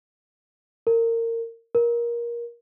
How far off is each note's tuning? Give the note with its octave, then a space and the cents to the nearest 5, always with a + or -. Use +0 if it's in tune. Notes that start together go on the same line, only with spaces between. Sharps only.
A#4 -25
A#4 +20